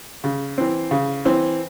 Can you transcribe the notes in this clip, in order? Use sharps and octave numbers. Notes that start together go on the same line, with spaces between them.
C#3
E3 C4
C#3
E3 C4